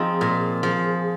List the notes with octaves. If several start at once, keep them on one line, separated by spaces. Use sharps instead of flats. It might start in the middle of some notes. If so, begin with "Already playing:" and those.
Already playing: F3 C4 D#4 G#4
A#2
F3